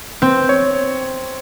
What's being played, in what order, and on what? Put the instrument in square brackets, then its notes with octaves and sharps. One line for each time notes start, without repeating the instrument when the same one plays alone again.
[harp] C4
[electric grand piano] C#5